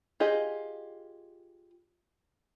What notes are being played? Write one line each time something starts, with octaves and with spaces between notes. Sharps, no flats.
F4 G4 G#4 D#5